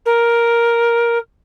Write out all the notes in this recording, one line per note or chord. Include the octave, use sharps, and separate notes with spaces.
A#4